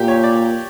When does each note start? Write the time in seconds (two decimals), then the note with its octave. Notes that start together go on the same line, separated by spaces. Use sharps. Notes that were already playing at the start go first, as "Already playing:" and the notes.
Already playing: A#2 G4
0.08 C#5
0.24 D5